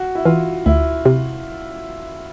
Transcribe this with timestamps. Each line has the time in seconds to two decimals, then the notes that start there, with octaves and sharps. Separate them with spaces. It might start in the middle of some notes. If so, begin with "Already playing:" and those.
Already playing: F#4
0.15 E4
0.25 E3 F4
0.66 D2 E4
1.06 C3